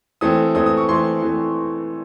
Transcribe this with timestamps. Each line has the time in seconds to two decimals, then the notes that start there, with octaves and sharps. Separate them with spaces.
0.21 E3 A3 C4 D#6
0.55 E3 A3 C4 D#6
0.66 D#6
0.77 C#6
0.89 E3 A3 C4 C6
1.22 E3 A3 C4